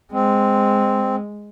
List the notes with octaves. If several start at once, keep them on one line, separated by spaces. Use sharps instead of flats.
G#3 C4